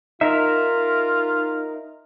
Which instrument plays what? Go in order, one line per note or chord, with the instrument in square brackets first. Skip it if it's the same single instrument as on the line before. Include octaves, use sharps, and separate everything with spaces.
[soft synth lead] D#4 [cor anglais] F4 [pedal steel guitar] A#4 E5